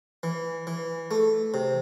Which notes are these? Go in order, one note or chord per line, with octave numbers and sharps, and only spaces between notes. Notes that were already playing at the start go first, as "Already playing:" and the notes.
E3
E3
A3
C3